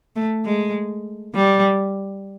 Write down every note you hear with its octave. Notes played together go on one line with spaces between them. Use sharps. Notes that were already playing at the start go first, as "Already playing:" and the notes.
A3
G#3
G3